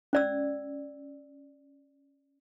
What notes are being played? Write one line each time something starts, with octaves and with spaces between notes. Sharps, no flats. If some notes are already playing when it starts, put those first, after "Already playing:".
C#4 D5 E6